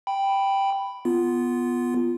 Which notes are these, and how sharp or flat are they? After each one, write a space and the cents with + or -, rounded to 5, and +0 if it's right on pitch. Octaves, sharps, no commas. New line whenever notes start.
G5 +0 B5 +0
B3 +0 F4 -10